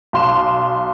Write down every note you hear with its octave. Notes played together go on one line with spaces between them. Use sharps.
B1 C6 E7